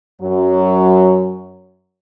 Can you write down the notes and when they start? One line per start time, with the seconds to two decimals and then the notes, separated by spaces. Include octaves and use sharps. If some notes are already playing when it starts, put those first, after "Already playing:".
0.21 F#2 F#3